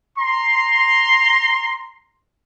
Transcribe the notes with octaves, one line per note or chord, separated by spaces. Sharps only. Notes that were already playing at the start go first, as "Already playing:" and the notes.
A#5 C6